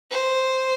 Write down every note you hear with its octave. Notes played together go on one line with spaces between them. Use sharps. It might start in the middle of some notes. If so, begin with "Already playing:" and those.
C5